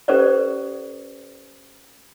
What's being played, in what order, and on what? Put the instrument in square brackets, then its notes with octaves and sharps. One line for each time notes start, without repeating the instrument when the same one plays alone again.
[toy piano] C#4 G4 A4 B4 C5 D5